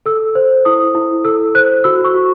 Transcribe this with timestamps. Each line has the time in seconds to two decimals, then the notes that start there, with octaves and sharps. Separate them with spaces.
0.06 A4 E6
0.35 C5
0.65 E4 D#6
0.95 E4
1.24 A4 E6
1.55 C5 F#6
1.84 F#4 E6
2.04 C#6
2.14 F#4